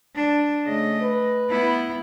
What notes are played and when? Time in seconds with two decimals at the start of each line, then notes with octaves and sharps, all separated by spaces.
0.16 D4
0.66 C#3 A3 D#5
1.02 B4
1.50 B3 E4